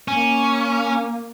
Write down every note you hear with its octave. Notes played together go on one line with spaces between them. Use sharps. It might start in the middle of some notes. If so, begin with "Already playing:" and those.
A#3 C#4